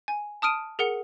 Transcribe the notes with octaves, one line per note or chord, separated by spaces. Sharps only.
G#5
A5 D#6 F6 D7 D#7
G#4 A#4 F#5 C#7